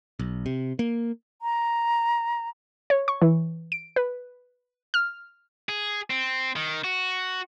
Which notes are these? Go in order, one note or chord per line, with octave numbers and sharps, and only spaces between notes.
B1
C3
A#3
A#5
C#5
C#6
E3
D7
B4
F6
G#4
C4
D#3
F#4